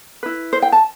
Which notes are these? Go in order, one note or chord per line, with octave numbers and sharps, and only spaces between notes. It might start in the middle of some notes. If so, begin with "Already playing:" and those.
E4 B4
C5
G5
A5